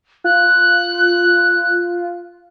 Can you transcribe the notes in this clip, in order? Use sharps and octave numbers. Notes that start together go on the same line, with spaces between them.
F4 F#6